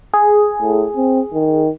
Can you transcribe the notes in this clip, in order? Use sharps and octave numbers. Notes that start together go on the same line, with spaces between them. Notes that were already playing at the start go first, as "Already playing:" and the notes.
G#4
A2
C4
D#3